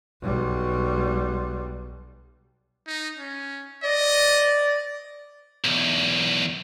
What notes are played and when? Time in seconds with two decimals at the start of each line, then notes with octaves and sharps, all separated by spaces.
0.22 B1 G3
2.87 D#4
3.18 C#4
3.84 D5 D#5
5.64 B1 E2